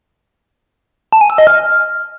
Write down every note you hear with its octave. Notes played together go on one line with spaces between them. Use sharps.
A5
G#5
E6
D#5
F6